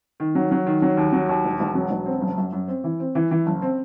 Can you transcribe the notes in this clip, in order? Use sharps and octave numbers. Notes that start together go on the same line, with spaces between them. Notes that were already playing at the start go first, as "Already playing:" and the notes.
D#3
F#3
F#3
D#3
F#3
D#2
F#3
D#2
E1
E1
F#3
E1
C4
F#1
F#2
F#2
C4
E3
C4
E3
E3
F#1
C4